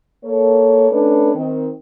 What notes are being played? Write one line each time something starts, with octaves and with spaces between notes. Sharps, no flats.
A#3 A4 C#5
A3 C#4 D4 A4 B4
D#3 C4